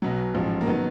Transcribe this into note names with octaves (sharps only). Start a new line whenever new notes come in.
B1 B2 F#3
A1 G#2 F3
A#3
D#3 F#3 B3